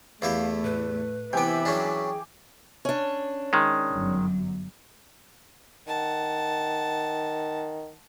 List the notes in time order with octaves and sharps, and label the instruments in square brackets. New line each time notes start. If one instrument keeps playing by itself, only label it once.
[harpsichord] E2 E4 G4 [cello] A3 [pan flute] F5
[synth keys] A2 [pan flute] B4
[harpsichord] C3 B3 [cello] E3 E4 [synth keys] G5 G#5 D6
[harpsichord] F#3 C#4 D4 [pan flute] G#4
[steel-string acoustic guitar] C#4 D4
[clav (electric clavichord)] D#3 G#3
[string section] G1 F#2 F#3
[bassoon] D#3 [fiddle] F#5 A5